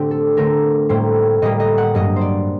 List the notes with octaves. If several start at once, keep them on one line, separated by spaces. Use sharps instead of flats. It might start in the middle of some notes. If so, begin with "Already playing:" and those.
Already playing: A2 D3 A3 C4 G4
A4
D3 A3 C4 A#4
A2 G3 A#3 C5
A2 G3 A#3 D#5
D#5
F#5
G2 F#3 A#3 D#5
C5 D5